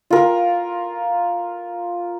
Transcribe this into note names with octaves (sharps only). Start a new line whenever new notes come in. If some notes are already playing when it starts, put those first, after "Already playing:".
F4 A#4